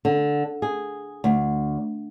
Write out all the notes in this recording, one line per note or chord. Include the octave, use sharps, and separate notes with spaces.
D3
G#4
D2